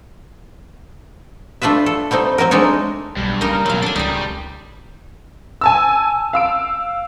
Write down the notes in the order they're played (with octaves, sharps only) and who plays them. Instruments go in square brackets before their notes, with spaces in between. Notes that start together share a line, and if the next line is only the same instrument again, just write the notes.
[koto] A3 D4 F4 B4 E5
A4
G3 A3 C4 D#4
F#3 C4 F#4 A#4
G#3 A3 D4 D#4 C#5
[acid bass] B1 [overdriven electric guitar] G2
[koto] C#3 A#3 D#4 [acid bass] A#4
[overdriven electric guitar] B2 F#3 [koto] C4 F5
[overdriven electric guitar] D4 [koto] A4 G#5
[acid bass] C#2 [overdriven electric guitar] G3 [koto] D#4 G#4
[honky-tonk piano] G#5 A5 E6
F5 E6 D7